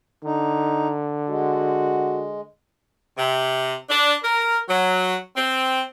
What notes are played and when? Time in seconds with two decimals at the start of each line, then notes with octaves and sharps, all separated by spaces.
0.24 D3 D#4
1.29 G#3 F#4
3.17 C3
3.90 D4
4.23 A#4
4.68 F#3
5.36 C4